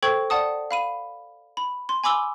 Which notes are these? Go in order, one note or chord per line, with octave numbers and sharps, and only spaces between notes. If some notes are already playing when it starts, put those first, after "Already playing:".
A4 C5 G5 C#6 G#6
D5 F#5 A5 D#6
F5 B5 D#7
B5
C6
G#5 B5 D6 E6 G7